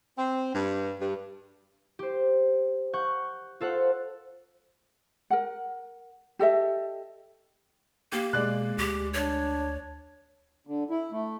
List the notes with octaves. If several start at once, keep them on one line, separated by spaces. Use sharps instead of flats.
C4
G2
G2
G4 C5
F#5 C#6 G6
F4 A4 C5 F#5
A#4 F#5
G4 A4 D#5 E5
A#3 G4
B2 G#3 D5 F#6
D2 G4
D4 C#5
D3
E4
A3